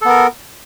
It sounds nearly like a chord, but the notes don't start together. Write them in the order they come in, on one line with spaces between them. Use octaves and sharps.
A4 B3 A#4